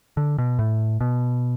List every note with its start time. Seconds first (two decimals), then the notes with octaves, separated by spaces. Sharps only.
0.17 D3
0.38 B2
0.59 A2
1.01 B2